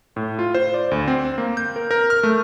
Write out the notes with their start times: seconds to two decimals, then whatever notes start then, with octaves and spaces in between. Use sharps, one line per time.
0.16 A2
0.39 F4
0.55 C5
0.74 D5
0.91 D2
1.08 C4
1.38 A#3
1.57 G6
1.76 A#4
1.91 A#4
2.10 F6
2.23 A3